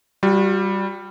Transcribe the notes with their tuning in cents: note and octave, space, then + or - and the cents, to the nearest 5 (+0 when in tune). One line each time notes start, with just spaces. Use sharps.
G3 -5 F#4 -45